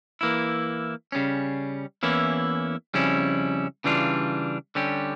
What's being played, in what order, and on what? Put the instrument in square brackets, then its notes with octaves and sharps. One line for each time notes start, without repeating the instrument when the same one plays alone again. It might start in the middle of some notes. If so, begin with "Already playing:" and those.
[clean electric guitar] E3 A#3 E4
C#3 G3 C#4
E2 E3 A#3 C#4 E4
F2 C#3 G3 C#4 E4
C#3 E3 G3 D4 F4
D3 G3 C#4 G4